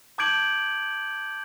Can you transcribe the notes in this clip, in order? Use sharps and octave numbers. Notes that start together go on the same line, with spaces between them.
A5 D6 G6 G#6 D7 F#7